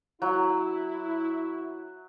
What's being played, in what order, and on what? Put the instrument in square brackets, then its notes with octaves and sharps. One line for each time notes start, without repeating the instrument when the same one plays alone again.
[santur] F#3 [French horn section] E4